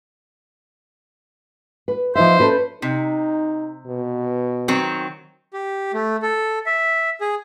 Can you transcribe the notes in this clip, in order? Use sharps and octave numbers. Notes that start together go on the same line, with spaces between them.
B4
F3 D#4 C5 E5
C#4 A4 B4
C3 D#4
B2
D#3 F#3 C4
G4
A3
A4
E5
G#4